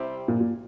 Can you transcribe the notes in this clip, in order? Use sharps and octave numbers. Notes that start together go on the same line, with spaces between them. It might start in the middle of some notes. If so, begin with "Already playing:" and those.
Already playing: C3 G3 C4 E4 G4
A#2
A#2